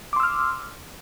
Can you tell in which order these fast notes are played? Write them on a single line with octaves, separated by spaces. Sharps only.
D6 C6 E6 F6